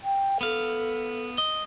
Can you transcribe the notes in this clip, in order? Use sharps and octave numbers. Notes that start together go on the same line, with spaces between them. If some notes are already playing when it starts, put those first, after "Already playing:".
G5
B3 A4 F5
D#5